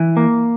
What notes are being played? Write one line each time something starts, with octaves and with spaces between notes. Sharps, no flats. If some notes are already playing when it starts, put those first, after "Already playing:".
Already playing: E3
A#3